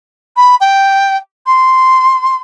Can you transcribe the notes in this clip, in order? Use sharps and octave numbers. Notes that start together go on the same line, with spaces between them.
B5
G5
C6